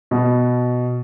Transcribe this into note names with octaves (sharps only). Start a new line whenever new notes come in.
B2